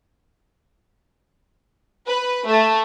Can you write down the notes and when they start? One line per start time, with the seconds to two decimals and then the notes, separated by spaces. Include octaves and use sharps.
2.07 B4
2.47 A3